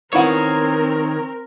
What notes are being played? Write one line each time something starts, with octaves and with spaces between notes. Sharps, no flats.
D#3 B3 C4 E4 A#4 C#5 F#5